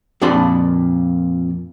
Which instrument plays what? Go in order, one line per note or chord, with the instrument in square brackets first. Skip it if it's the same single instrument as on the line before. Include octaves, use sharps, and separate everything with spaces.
[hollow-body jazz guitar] F2 A#2 D4 D5 B5 C6